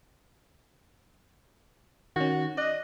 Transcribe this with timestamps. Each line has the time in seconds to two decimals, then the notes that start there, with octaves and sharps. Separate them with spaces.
2.16 D#3 C#4 F#4
2.57 D5 D#5 F#6